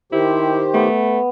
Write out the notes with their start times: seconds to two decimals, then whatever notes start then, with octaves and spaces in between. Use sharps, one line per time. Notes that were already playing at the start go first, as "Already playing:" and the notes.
0.12 D#3 E4 G4 C5
0.74 A3 B3